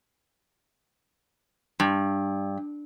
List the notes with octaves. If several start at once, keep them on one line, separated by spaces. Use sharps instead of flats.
G2